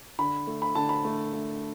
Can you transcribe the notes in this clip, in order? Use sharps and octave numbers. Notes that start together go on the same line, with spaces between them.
D3 B5
A3
B5
D3 A5
B5
A3
A3